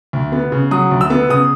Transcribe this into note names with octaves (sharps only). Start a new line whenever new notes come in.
D2
B3
C#3
F#3 D#6
D2
E6
B3
C#3 D#6